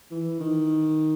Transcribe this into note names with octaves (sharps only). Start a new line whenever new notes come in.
E3
D#3